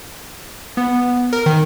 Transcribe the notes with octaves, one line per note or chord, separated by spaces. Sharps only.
B3
A#4
D#3